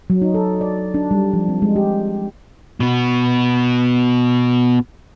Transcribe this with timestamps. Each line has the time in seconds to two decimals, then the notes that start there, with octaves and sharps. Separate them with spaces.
0.10 F#3
0.22 D#4
0.34 A4
0.61 D5
0.94 D4
1.11 G3
1.33 F3
1.49 C4
1.62 G#3
1.76 G4
2.81 B2 B3